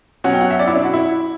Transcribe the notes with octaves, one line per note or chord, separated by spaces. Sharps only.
B2 F#3 C#4 F#5
G5
F#5
E5
D5
E4
D4
F#4
E4